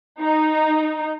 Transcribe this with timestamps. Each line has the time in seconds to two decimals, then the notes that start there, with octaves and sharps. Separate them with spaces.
0.22 D#4